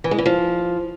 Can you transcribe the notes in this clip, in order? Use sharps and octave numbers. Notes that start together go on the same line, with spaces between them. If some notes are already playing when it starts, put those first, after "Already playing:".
E3
G#3
E3
F3